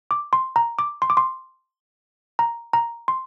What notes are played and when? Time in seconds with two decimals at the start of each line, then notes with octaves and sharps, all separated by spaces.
0.11 D6
0.33 C6
0.56 A#5
0.79 D6
1.02 C6
1.10 D6
1.17 C6
2.39 A#5
2.73 A#5
3.08 C6